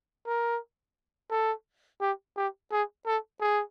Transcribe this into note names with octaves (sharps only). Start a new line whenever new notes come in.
A#4
A4
G4
G4
G#4
A4
G#4